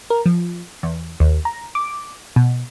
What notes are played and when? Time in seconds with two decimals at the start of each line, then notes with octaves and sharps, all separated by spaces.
0.10 A#4
0.26 F3
0.83 E2
1.20 D#2
1.45 A#5
1.75 D6
2.36 B2